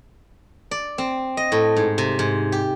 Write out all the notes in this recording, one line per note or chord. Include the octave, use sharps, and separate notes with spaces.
D5
C4
D#5
A2
G#2
C3
G#2
G4